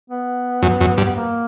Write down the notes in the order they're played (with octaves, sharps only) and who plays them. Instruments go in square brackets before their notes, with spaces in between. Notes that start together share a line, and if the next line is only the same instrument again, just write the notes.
[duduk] B3
[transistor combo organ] F#2
F#2
G2
[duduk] B3
A#3